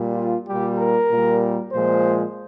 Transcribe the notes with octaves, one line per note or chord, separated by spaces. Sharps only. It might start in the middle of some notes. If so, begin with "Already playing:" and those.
Already playing: A#2 G3
F4
A#2 G3 G4
A#4
A#2 G3
A#2 F3 G#3 C5